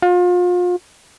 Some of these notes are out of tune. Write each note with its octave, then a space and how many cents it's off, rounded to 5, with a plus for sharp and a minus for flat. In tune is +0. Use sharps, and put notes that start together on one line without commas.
F4 +35